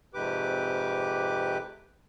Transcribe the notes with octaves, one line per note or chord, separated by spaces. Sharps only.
F2 G#2 C3 G4 B4 D6